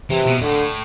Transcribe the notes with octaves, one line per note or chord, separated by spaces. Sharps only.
C3 E3
B2
A2 D3